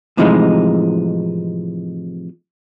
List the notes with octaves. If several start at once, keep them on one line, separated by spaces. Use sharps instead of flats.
A2 C3 E3 F3 G#3 D#4